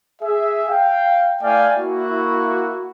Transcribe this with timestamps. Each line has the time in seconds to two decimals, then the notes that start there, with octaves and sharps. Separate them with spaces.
0.22 G#4 E5
0.69 F5 G5
1.42 A3 E4 D5 F5 G5 G#5
1.77 A#3 E4 F#4